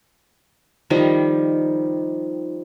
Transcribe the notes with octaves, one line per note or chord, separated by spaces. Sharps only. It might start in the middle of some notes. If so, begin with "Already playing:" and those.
D#3 F3 G3 D#4